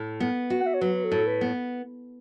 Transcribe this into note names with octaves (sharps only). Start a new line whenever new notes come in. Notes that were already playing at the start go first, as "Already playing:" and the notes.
Already playing: A2
B3
F#4
F#5
E5
C#5
F#3 B4
A4
A2
B4
B3